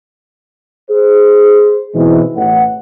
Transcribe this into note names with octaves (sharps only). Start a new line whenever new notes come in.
G#4 C5
G#2 B2 E3 G#3 C4 E4
A1 F#5